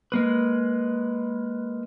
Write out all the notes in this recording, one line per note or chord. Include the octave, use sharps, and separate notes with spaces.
G#3 A#3 B4